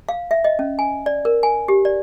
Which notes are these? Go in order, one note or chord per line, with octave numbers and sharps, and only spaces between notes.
F5
E5
D#5
C#4
G#5
D5
A#4
G#5
G4
D5